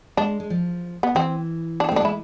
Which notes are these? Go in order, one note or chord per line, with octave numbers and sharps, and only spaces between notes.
G#3 D4
G#3
F3
B3
E3 C4
D4
C4
A3 D4
G#3 E4